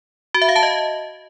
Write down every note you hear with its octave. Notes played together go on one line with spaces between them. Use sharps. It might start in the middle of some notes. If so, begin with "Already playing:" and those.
F#4
E5
F5
A5
D#5